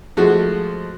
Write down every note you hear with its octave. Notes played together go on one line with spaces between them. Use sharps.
F3 G#3 A3 F#4